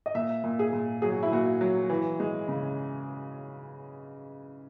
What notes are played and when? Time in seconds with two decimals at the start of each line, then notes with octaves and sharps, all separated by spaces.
0.06 D#5
0.15 A#2 E5
0.44 A#2
0.59 G#4
0.73 A#2
1.02 F#3 G#4
1.12 F#4
1.23 E4
1.31 A#2 F#4
1.61 F#3
1.90 E3
2.20 G#3
2.48 C#3